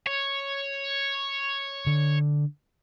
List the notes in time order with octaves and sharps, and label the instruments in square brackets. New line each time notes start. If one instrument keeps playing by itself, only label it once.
[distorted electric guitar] C#5
[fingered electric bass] D3